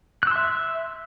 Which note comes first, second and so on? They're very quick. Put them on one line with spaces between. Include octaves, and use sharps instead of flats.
F#6 E6 C6 E5